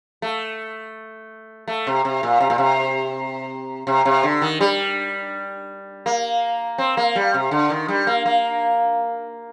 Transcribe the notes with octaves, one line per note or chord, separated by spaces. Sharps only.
A3
A3
C3
C3
A#2
C3
A#2
C3
C3
C3
D3
D#3
G3
A#3
C4
A#3
G3
C3
D3
D#3
G3
A#3
A#3